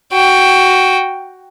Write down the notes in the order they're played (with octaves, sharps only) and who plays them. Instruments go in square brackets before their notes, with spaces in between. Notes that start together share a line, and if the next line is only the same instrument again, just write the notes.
[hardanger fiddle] F#4 G5